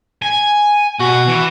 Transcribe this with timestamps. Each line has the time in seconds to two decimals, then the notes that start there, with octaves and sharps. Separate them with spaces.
0.22 G#5
1.00 B2 F#4 F#5
1.28 E3